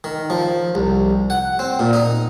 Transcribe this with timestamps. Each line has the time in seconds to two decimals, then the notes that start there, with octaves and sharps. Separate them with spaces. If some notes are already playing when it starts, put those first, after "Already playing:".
0.04 D#3
0.30 F3
0.75 C2
1.30 F#5
1.59 C4
1.79 A#2
1.93 D#4